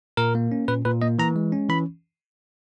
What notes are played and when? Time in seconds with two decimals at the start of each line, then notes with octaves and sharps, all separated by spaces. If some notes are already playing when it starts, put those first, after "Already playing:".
0.17 A#2 A#4
0.35 A#3
0.52 C#4
0.68 A#2 B4
0.85 A#2 B4
1.02 A#3 D#5
1.19 E3 A#5
1.36 G#3
1.52 C#4
1.69 E3 B5